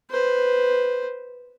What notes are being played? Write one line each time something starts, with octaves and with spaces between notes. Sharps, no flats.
B4 C5